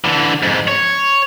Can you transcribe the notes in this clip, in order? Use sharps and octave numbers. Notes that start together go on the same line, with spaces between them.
D3 E3
F2 G#2
C#5